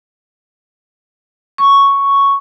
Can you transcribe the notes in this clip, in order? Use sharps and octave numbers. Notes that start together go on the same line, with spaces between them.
C#6